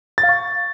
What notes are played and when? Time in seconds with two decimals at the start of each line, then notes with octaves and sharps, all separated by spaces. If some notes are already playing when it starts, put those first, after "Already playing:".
0.18 A6
0.23 F5
0.29 C#6